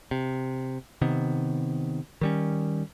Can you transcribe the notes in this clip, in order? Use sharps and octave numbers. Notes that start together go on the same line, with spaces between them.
C3
C3 D#3 B3
D#3 G3 C#4